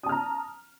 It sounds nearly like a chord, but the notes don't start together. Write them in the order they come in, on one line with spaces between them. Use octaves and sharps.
D#6 A5 F6 A#5